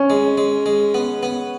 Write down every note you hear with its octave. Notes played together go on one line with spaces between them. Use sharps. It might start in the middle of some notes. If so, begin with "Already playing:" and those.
Already playing: C#4
G#3
G#3
G#3
B3
B3